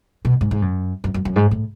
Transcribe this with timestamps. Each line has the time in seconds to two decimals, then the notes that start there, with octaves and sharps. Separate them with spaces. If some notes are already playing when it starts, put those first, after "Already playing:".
0.25 B2
0.41 G#2
0.51 G#2
0.62 F#2
1.04 F#2
1.14 F#2
1.25 F#2
1.36 G#2
1.51 A2